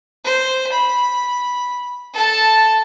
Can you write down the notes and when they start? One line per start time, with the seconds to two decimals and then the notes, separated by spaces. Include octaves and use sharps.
0.24 C5
0.72 B5
2.14 A4 A5